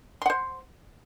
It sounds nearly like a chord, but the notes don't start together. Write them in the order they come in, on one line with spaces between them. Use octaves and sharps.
C6 F#5 C5